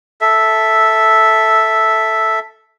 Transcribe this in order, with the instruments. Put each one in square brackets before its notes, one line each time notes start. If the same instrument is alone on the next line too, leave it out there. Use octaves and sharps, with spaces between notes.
[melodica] A4 E5